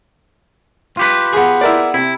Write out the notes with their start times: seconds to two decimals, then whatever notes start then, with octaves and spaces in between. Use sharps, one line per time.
0.97 F4 G4 B4
1.33 B3 G#4
1.61 E4 A#4 D5
1.94 C3 E4